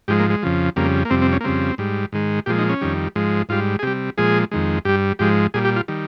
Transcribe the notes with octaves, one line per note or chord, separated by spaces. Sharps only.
G#2 F3 G#3 G4
A#3
G#3
F2 C#3 F3
F2 C#3 G3 A#3
A#3
F2 C3 G3 C4
C4
C#4
A#3
F2 C#3 G3 C4
G#2 G3
G#2 D#3 G#3
A#2 F3 G#3 G4
D#4
C#4
F2 D#3 G3
G#2 F3 G#3
G#2 G3 F4
G#4
C3 G3 G4
A#2 F3 G#3 G#4
F2 D#3 G#3
G2 G3 G4
G#2 F3 G#3 G4
A#2 G3 G#4
G4
F4
D#3 G3